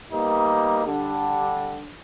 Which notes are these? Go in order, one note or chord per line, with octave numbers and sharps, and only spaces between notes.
G3 A#3 B3 D#4
D3 G3